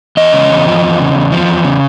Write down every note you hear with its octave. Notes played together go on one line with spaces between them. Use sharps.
E2 D#5
C#3
E2
F3
E2
C#3
E2
F3
E2
C#3